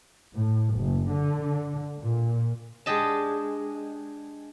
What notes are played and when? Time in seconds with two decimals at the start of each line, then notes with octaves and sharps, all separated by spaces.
0.34 A2
0.73 F#1
1.11 D3
1.99 A#2
2.86 G#3 D4 G4 D#5 A5